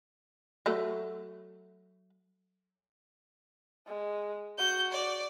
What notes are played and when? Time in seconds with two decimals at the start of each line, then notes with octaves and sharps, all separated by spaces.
0.66 F#3 A3
3.87 G#3
4.58 F#4 G6
4.93 D5